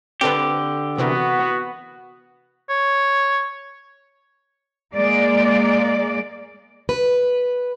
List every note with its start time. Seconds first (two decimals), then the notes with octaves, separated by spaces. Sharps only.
0.21 D3 C4 G4 A4 B4
0.98 C3 E3 B3 F#4 A#4
2.69 C#5
4.95 G#3 A#3 D5
6.89 B4